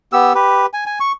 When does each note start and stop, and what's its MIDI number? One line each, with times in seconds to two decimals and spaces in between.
0.13 0.33 59
0.13 0.33 67
0.13 0.33 88
0.35 0.66 67
0.35 0.66 71
0.73 0.84 80
0.86 0.99 80
1.00 1.12 85